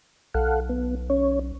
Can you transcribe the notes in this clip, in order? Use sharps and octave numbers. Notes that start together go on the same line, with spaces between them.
B1 A4 F5 F#5
B3
C#4 C#5